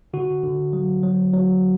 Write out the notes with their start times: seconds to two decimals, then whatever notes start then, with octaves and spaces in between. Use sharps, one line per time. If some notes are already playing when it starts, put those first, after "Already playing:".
0.13 D3 F#4
0.43 D3
0.73 F#3
1.03 F#3
1.33 F#3